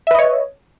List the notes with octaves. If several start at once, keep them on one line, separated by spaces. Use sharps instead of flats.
B4 C#5 D#5 E5